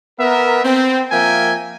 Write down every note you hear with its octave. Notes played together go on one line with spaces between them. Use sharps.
B3 A#4 E5
C4
F3 A#3 A#4 E5 G5 G#5